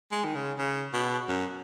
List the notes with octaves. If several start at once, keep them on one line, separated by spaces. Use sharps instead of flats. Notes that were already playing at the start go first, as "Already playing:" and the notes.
G#3
D#3
C#3
C#3
B2
F#2